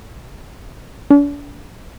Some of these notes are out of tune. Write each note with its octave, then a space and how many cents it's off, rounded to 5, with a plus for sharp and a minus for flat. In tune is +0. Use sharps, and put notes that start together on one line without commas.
D4 -40